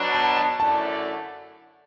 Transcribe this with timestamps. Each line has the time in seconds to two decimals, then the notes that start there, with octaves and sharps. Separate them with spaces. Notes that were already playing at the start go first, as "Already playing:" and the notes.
Already playing: B2 F#3 D4
0.15 A5
0.37 A5
0.60 F#2 D3 A3 E4 D5 A5